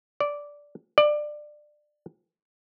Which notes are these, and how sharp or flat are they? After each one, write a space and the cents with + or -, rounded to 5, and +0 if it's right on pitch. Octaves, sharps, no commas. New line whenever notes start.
D5 -10
D5 +20